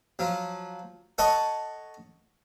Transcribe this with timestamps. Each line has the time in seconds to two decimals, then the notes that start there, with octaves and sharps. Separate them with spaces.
0.19 F3 F#3
1.18 A4 C#5 D#5 F#5 A5 C#6